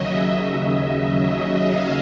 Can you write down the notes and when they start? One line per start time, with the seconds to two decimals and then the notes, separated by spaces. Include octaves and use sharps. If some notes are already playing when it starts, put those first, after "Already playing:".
Already playing: D#2 C#3 F#3 D#5 E5
0.20 D#5
1.35 E5
1.65 F5